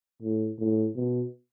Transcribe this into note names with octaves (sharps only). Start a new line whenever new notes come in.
A2
A2
B2